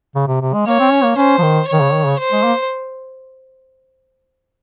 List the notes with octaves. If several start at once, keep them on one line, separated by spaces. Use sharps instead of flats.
C#3
C3
C3
G#3
A#3 C#5
C4
C#4
A#3
C#4 C5
F3
D#3
C#5
D#3
C#3
D#3
C#3
C5
G#3
A#3